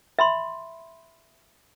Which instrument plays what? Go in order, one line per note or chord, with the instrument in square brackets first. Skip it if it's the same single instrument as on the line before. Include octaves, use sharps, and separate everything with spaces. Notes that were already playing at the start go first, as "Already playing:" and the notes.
[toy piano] E5 B5 C6